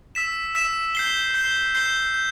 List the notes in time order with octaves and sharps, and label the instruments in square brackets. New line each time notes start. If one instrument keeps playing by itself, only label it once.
[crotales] E6 B6 E7
E6 B6 E7
G6 C7 G7
G6 C7 G7
G6 C7 G7
G6